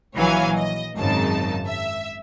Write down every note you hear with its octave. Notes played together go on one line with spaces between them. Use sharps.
A#1 E3 F#3 C#5 F5 G#5
D#5
G#1 F#2 C#3 D#4 A5
E5